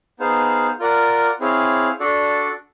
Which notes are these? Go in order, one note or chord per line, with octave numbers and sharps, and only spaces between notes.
B3 D#4 G#4 C5 F5
F4 A#4 D5 F#5
C4 E4 G#4 C#5 F5
D4 F#4 A4 D5